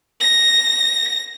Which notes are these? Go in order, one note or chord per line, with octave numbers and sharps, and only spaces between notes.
A#6